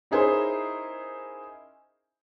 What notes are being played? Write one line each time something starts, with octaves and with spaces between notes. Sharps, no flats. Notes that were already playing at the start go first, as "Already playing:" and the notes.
C#4 D#4 E4 G#4 A#4 C5